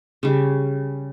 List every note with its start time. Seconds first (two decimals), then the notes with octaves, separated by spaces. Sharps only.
0.23 C#3 G3